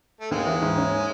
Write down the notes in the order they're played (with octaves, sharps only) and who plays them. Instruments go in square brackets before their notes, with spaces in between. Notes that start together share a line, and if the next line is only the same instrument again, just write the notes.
[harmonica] A3
[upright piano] D#2 [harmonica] G#3
[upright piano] E3
G#2
C#4